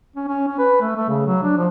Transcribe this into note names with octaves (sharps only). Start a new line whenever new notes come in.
C#4
C#4
C#4
B4
A3
A3
C#3
F#3
D4
F3